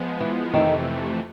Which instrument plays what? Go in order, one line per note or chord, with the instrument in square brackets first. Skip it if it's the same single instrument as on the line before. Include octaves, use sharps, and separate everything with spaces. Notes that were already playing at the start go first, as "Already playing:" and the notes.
Already playing: [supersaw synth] F3 G#3 B3
[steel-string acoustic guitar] E3
[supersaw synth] F2 C3 E3 A3 [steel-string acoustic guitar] D#3